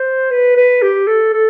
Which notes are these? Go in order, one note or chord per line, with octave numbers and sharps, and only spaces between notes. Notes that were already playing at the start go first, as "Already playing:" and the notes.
Already playing: C5
B4
B4
G4
A4
A4